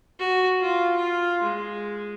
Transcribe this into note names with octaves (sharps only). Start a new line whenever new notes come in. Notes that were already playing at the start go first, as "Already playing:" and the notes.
F#4
F4
F4
G#3